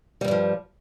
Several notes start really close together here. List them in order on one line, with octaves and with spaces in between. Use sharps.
G3 E2 G2 F3